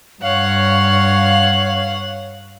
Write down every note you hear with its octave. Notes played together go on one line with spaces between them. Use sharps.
G2 C#5 F5 F#5